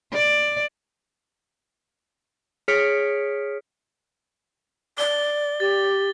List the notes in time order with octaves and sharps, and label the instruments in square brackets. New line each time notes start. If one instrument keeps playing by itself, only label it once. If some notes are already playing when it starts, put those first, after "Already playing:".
[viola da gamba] D5
[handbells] G#4 C#5 F6 B6 C#7 D7
[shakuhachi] D5 [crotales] G7
[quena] G4 [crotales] A6